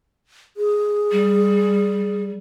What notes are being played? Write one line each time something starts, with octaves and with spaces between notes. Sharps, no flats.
G#4
G3